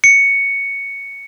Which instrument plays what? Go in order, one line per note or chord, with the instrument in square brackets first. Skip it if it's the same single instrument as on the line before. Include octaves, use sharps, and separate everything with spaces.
[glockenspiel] C#7